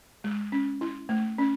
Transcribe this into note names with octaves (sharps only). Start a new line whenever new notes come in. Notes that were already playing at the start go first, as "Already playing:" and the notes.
G#3
C#4
E4
A3
C#4